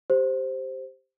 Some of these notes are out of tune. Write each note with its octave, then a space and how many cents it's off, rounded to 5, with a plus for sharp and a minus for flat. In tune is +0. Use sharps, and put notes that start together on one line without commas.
G4 +0 C5 +0